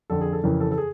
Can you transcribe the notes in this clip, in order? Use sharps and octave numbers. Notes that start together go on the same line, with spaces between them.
F2 D3 A4
G#4
A4
F2 C#3 E3 A#4
A4
A4
G#4